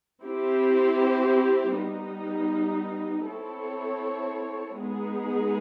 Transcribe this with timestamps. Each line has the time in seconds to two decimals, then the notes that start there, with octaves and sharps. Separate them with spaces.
0.23 C4 E4 G4 C5
1.75 G3 B3 D#4
3.27 C4 E4 A4 C#5
4.78 G#3 B3 D#4 G#4